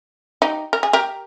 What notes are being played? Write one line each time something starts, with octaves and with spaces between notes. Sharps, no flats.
D#4 G4
A#4
G#4
G4 A#4